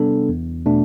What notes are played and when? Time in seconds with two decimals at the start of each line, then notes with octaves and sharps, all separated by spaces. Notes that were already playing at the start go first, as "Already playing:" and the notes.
Already playing: C3 G3 B3 D4 A4
0.29 E2
0.66 B2 A3 D4